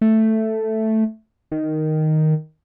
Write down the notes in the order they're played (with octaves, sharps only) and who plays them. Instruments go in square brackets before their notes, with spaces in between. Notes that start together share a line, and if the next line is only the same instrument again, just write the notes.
[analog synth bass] A3
D#3